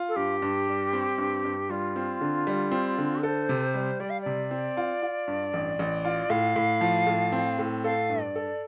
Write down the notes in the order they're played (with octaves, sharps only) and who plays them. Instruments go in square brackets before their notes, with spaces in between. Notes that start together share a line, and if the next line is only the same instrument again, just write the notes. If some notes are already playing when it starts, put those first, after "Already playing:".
Already playing: [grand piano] F4
[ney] A4
[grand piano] G2 [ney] G4
[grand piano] G2
G3
C4
G2
G2
[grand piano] G3 [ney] F4
[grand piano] C4
D3
G3
C4
D3
[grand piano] A4 [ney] C5
[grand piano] C3
G3
[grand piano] G3 [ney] D5
[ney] F5
D5
[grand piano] C3
C4
F4
F4
G2
A1
A1
F4
[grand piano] A2 [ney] F5
[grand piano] A2
F3
A2
C4
A2
[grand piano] A4 [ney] F5
[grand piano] G2
[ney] D5
[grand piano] A4